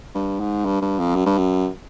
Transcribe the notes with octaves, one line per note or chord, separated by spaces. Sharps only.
G2
G#2
G2
G2
F2
F#2
G2
F#2